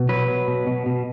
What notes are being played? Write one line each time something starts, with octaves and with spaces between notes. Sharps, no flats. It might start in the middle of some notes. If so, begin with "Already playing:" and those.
Already playing: B2
F#3 B4
F#3
B2
B2
B2